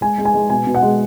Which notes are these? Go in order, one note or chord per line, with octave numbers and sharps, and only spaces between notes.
G#3 G#5
G#3
G#5
G#3
B2 G#5
B2
F#5
G#3